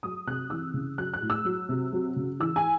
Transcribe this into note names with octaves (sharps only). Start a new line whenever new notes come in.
F#3 D#6
C3 F#6
E3 E6
C#3
F#3 F#6
F#6
A2
E6
F#3
C3
F#3
C#3
E3 E6
G#5